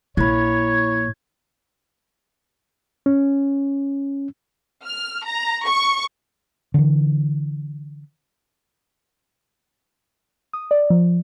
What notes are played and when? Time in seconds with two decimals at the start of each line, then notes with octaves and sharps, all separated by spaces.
0.17 A#1 A#2 E4 C#5 B5 G#6
3.06 C#4
4.85 F6
5.25 A#5
5.66 C#6
6.74 D3 E3
10.53 D#6
10.71 D5
10.90 F3